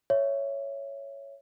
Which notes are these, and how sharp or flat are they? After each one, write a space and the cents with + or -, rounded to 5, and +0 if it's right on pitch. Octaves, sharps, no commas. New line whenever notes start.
C#5 +0 E5 +10